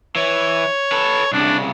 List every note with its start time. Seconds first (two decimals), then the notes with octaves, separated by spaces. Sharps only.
0.16 E3 C#5
0.92 A4 B4
1.32 C2 C#3 D4